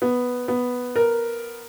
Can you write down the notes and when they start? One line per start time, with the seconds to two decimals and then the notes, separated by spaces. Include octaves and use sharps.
0.02 B3
0.48 B3
0.96 A#4